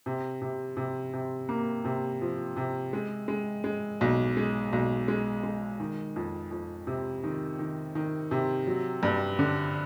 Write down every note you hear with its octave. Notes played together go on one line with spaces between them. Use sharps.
C3
C3
C3
C3
A#3
C3
F3
C3
G#3
G#3
G#3
B1
G#3
B1
G#3
G#3
D#3
F2
F2
C3
D#3
D#3
D#3
C3
F#3
G2
D3